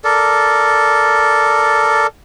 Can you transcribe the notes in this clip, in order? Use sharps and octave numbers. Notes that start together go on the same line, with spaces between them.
A4 A#4 D5